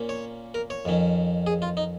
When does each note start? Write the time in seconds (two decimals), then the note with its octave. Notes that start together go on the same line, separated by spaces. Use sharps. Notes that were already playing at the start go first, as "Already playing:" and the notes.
Already playing: A#2 A#3 C#4
0.09 C#5
0.54 A#4
0.70 C#5
0.85 F2 D#3 C#4
1.47 G#4
1.62 F4
1.77 D#4